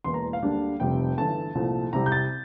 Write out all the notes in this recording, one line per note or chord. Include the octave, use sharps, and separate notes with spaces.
E1 E2 E3 A#3 C6
A#5
F5
D2 D3 G3 A#3 D4
F1 F2 C3 G3 C4 G5
G1 G2 E3 A3 A5
C2 A#2 F3 A3
C2 C3 G3 C4 A#5
G6
A6